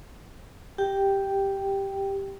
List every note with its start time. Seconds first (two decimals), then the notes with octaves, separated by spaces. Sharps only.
0.78 G4 G5